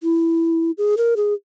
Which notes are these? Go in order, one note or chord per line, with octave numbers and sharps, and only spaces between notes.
E4
G#4
A#4
G#4